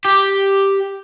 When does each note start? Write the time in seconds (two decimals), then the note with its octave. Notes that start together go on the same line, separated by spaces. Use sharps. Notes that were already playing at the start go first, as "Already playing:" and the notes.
0.05 G4